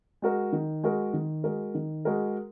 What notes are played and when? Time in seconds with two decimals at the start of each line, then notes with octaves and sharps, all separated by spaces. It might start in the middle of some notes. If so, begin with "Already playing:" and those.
0.22 G#3 F#4 A#4
0.52 D#3
0.84 G#3 F#4 A#4
1.13 D#3
1.44 G#3 F#4 A#4
1.75 D#3
2.05 G#3 F#4 A#4